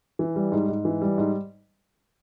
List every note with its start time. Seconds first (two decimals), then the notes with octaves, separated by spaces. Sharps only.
0.19 E3
0.36 G3
0.52 G#2
0.68 G#2
0.85 E3
1.01 G3
1.18 G#2